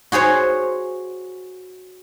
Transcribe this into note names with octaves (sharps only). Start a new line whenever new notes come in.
F#4 G#4 C5 C#5